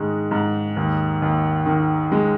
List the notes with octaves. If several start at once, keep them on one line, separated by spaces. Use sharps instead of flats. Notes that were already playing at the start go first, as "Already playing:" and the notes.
Already playing: G#2 D#3 G#3
G#2
D#2
D#2
D#3
G#3